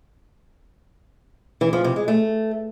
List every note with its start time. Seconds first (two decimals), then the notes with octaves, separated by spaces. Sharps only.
1.61 E3
1.73 F3
1.84 C3
1.96 G#3
2.08 A3